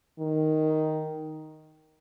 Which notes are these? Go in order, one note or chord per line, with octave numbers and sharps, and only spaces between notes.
D#3